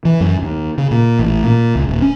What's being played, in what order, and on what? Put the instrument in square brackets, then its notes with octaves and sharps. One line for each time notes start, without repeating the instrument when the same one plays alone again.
[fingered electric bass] E3
F#2
D#2
C#3
A#2
A1
A#2
C#2
D#1
C#4